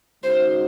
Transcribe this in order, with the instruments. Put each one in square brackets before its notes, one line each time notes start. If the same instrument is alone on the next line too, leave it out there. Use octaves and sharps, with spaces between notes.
[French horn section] C#3 G#3 D#4 F#4 [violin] C5